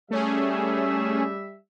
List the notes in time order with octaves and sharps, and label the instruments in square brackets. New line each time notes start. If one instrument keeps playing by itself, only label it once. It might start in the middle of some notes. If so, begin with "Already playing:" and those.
[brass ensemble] G3 E5 [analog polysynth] A3 C#4 G#4